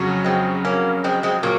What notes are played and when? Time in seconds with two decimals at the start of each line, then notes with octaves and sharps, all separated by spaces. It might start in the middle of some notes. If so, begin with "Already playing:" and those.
Already playing: F2 C#3 F#3 C#4 F#4
0.24 G#3 C4
0.65 A#3 C#4
1.04 G#3 C4
1.23 G#3 C4
1.43 A#2 F#3 A#3